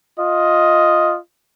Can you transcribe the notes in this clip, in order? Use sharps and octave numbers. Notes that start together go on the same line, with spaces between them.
F4 D#5